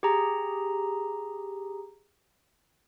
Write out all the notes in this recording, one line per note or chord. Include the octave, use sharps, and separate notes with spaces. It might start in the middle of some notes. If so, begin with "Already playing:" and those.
G4 G#4 A#5